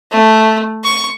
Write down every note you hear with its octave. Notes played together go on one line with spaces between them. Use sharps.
A3
C#6